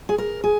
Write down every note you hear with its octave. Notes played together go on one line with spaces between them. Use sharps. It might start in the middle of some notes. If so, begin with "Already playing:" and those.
G#4
A#4
G#4